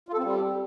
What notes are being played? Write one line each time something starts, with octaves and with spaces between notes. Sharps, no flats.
F4
A4
C4
G3